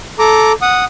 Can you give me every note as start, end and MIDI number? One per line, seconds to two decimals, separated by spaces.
0.19 0.53 69
0.19 0.53 82
0.19 0.53 86
0.62 0.85 78
0.62 0.85 87